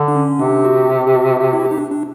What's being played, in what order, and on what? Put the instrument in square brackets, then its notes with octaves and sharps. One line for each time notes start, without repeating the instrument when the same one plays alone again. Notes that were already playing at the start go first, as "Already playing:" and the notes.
Already playing: [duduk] D3
[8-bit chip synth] D4
C#4
[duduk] C3 [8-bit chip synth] D4
[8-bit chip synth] F#4
G4
G4
F#4
F#4
E4
F#4
G4
D#4
D4
D4